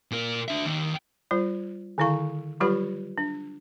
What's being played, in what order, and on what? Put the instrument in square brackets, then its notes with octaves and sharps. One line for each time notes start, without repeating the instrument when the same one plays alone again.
[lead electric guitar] A#2 A#4
D4 E5
D#2 D#3
[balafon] G3 F4 C5
D3 D#3 E4 F5 C#6
F#3 G3 F4 G4 B4 B5
D4